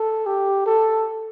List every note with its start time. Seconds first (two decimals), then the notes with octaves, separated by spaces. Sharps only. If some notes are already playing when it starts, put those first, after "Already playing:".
Already playing: A4
0.26 G4
0.66 A4